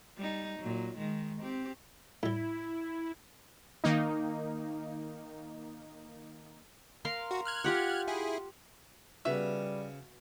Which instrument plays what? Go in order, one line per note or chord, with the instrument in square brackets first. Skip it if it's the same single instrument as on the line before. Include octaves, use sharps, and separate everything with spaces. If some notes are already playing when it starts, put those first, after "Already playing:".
[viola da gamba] G3 D#4
A#2 F#3
D#3 G#3
C4 G4
[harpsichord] A2 G3 [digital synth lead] E4
[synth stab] D#3 A#3 D#4
[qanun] A#4 F5 C6
[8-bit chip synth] F#4
F6 F#6 G#6
[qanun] F4 G4 F#5
[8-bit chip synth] E4 G#4
[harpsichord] C#3 [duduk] G3 [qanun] B3 F#4 [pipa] E5